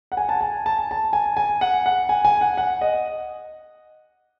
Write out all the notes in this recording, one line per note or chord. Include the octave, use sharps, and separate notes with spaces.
F#5
G#5
A5
G#5
A5
A5
G#5
G#5
F#5
F#5
G#5
G#5
F#5
F#5
D#5